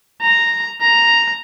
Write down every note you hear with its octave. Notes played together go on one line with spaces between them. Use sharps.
A#5
A#5